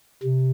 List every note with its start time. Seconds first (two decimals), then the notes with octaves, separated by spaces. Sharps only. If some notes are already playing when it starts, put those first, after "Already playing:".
0.23 C3